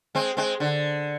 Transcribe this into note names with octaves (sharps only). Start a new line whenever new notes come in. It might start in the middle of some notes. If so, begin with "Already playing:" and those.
G#3 C4
G#3 C4
D3